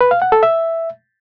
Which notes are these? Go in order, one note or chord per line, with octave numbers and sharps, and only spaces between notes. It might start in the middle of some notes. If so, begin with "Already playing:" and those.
B4
F5
F#5
A4
E5